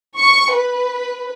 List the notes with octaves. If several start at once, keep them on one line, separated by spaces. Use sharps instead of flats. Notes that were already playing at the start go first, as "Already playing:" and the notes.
C#6
B4